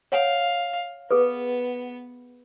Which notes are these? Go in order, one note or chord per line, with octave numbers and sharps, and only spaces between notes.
C#5 F5 F#5 G#5
B3 G#4 A4 B4